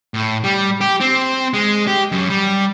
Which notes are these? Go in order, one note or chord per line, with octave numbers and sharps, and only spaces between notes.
A2
G3
G4
C4
G#3
G4
F#2
G3